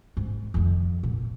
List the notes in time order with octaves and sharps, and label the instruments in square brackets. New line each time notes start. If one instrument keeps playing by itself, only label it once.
[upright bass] G#2
F2 D#3
A#2